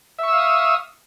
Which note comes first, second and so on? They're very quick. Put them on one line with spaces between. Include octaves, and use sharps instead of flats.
E5 C#6 E6 F5 D#6